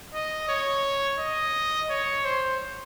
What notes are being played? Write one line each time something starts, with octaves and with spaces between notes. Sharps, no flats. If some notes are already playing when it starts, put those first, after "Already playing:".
D#5
C#5
D#5
C#5
C5